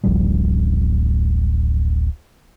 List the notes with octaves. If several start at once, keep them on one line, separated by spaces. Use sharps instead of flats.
D1 A1 F3 G3